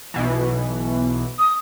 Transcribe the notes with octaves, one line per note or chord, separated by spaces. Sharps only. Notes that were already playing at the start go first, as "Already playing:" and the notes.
B1 B2 E3
D#6